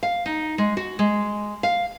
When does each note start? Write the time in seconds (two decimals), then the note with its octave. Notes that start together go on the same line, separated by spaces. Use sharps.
0.03 F5
0.26 D#4
0.58 G#3
0.77 F#4
0.99 G#3
1.63 F5